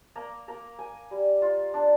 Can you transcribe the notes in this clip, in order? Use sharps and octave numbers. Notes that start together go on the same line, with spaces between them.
A#3 A#5
A#3 A#5
A#3 G#5
G3
F4
D4